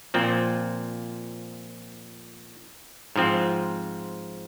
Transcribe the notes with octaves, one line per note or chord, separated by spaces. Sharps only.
A#2 F3 C4
G#2 F3 C4